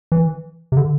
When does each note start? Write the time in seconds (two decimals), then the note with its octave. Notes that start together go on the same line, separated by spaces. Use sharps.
0.12 E3
0.72 C3
0.77 D3